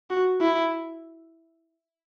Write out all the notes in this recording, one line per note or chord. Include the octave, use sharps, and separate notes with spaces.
F#4
E4